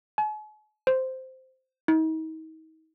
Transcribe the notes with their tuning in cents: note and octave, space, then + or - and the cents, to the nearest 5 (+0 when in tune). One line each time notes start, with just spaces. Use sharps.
G#5 +45
C5 -5
D#4 +40